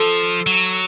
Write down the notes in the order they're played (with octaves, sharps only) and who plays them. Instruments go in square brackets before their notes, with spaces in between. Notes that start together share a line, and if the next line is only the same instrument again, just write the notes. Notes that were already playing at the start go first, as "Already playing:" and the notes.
Already playing: [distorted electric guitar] F3 [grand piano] A4
[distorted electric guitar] F#3